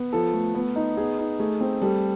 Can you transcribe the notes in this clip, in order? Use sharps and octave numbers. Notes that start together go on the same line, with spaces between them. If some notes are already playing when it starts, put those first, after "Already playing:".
Already playing: B3
F3 A4
A3
B3
D#4
B3 G#4
D#4
A3 G#4
C4
G3 A4